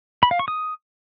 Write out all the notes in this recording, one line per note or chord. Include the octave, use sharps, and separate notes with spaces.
B5
F5
C#6
D#6